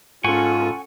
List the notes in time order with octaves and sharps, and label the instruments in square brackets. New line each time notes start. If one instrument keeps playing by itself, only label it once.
[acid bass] G#2 [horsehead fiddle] C#4 A4 [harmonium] F4 [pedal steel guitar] F#5 G#5 C#6